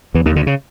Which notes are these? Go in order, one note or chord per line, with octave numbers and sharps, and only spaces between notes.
E2 E3
D#2 D#3
D2 D3
C#3